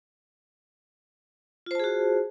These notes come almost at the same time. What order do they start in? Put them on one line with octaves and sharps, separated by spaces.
F4 C5 A5 G#4 F#4